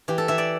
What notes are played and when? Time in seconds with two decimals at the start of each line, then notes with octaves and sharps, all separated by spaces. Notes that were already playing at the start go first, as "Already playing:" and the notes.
0.08 E3 G4
0.18 A4
0.28 E3 E5
0.38 D5